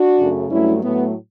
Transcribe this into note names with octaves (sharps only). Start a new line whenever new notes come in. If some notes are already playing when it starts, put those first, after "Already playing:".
Already playing: D4 F#4
F#2 C#3 F#3 A3
G2 F#3 A3 C#4 E4
A2 F#3 A3 B3